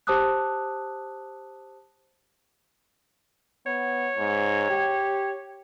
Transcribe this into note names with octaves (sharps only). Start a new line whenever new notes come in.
G4 C5 A5 D6 D#6 F#6
B3 C#5
G#2
G4